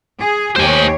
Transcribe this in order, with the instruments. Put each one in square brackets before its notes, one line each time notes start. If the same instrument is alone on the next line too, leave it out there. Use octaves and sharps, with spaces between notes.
[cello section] G#4
[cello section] D#2 G4 C#5 [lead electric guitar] C5 G#5